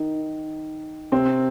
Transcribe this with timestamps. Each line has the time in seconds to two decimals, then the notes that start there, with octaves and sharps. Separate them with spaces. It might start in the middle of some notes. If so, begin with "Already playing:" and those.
Already playing: D#3 D#4
1.12 C3 C4